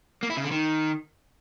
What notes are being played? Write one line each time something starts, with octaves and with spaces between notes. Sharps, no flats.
A#3
E4
C#3
D3
D#3